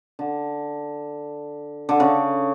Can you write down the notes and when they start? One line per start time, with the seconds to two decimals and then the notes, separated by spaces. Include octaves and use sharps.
0.19 D3
1.89 D3
2.00 C#3